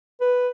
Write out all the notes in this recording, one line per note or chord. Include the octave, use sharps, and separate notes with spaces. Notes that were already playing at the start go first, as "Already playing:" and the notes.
B4